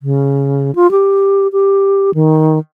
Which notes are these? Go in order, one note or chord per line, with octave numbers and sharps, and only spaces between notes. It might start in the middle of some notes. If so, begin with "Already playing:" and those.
C#3
F4
G4
G4
D#3